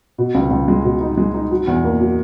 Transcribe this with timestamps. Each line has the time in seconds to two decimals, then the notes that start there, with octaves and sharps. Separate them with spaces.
0.18 B2
0.35 C#2
0.51 C#2
0.68 G#3
0.84 B2
1.01 D#4
1.17 G#3
1.34 D#4
1.51 F#3
1.67 E2
1.84 A#3
2.00 F#3